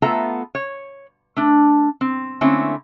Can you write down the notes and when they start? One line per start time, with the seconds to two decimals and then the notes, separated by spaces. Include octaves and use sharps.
0.02 A3 B3 F4 A4 E5 A#5
0.55 C#5
1.36 A3 D4
2.01 C4
2.41 D3 A3 A#3 C4 C#4 E4